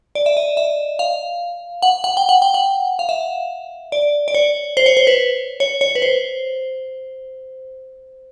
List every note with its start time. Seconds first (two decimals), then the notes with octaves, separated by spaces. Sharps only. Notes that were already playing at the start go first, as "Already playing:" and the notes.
0.15 D5
0.26 E5
0.37 D#5
0.57 E5
0.99 F5
1.82 F#5
2.04 F#5
2.17 G5
2.29 F#5
2.42 G5
2.54 F#5
2.99 F5
3.09 E5
3.92 D5
4.28 D5
4.34 C#5
4.77 C5
4.86 C#5
4.97 C5
5.07 B4
5.60 C#5
5.81 C#5
5.95 B4
6.02 C5